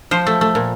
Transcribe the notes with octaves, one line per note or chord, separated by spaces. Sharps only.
F3 C5
A3
A3
A#2